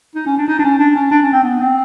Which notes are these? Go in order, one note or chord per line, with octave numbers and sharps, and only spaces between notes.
D#4
C#4
D4
D#4
D4
C#4
D4
C#4
D4
C#4
C4
B3
C4